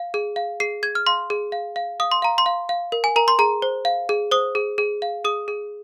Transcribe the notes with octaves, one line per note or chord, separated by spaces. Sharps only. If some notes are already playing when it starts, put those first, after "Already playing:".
Already playing: F5
G#4
F5
G#4 C7
G#4 G#6
F6
F5 C6
G#4
F5
F5
F5 D#6
C6
F5 A#5
C6
F5
F5
A#4
G#5
A#4 A#5
C6
G#4 A#5
C5
F5
G#4
C5 D#6
G#4
G#4
F5
G#4 D#6
G#4